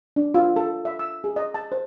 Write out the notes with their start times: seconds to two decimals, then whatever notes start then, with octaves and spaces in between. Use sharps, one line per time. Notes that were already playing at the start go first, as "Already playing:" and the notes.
0.16 D4
0.34 F4
0.56 A4
0.85 E5
0.99 E6
1.24 G#4
1.36 D#5
1.54 A5
1.72 C5